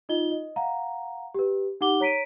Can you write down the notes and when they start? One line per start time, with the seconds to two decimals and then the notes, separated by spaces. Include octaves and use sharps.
0.09 D#4 F4 D#5 G7
0.32 D#5
0.56 F5 F#5 A#5
1.34 G4 B4
1.81 D#4 G4 F#5 D6 G7
2.00 C#5 A#5 B6 D7 D#7